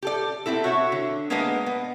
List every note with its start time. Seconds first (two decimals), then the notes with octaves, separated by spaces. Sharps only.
0.03 G4 A4 D5
0.46 B3 C4 E4 A4
0.64 F#4 C#5 E5
0.92 D3
1.30 G#3 A#3 B3 D4 B4 D#5
1.66 B3